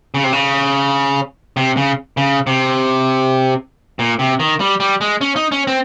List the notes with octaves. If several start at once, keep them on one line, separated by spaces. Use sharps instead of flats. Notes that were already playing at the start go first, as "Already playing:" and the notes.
C#3
C3
C#3
C3
C#3
C#3
C3
A#2
C3
D#3
G3
G3
G#3
C#4
D#4
C#4
C4